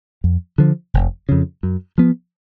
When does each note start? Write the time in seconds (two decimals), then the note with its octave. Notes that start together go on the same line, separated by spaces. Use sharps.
0.24 F2
0.58 D3 F3
0.94 F1
1.29 F2 C#3
1.63 F#2
1.98 F3 B3